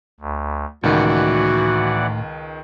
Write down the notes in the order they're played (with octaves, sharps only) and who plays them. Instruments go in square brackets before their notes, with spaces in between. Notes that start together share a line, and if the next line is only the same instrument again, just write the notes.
[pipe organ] D2
[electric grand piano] C#2 D#3 [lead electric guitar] A2 [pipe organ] E3 D5 F#5 [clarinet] F#4